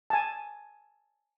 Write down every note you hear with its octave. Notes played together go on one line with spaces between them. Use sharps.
G#5 A5